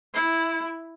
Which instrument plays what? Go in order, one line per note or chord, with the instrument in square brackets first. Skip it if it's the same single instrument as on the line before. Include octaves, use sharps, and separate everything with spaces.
[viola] E4